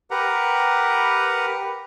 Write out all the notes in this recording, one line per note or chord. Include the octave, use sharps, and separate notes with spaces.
G4 A#4 B4 F#5 A#5